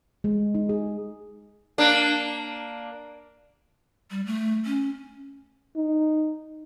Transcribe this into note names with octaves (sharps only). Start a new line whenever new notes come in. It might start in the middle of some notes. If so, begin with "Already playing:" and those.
G#3
D#4
G#4
A#3 D4
G3
A3
C#4
D#4